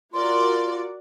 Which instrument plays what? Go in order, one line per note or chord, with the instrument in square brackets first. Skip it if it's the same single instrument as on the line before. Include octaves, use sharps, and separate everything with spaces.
[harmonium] F4 [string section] F#4 A#4 D5 [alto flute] C6